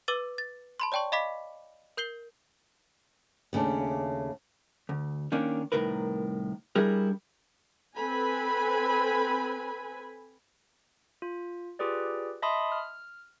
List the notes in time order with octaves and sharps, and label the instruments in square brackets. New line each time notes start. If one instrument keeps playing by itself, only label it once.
[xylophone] B4 D6 E6 A6 D#7
A6
A5 B5 C6
C#5 D5 G5 A5 C#6
D#5 F5 B5 D6 B6
A#4 G6 C7 G7
[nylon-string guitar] D#2 C#3 A3 D4
[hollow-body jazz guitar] D2
D#3 A#3 C#4 D4
C2 A2 D#3 A#4 B4
G3 D4 E4 G#4 A#4
[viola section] C4 A4 B4 G#5 B5
[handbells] F4
F4 G4 G#4 B4 D5
D#5 E5 A5 B5 C6 D#6
F6